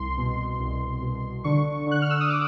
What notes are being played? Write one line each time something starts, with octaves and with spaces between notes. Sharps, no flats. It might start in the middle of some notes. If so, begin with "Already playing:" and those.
Already playing: C2 C6
B2
C2
B2
D3 C#6
D3 F#6
F6
E6
D#6
D6